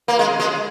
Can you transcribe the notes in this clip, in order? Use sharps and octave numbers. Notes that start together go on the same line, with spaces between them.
A#3
G#3
G#3